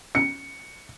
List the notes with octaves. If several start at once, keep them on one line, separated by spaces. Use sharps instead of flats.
C#7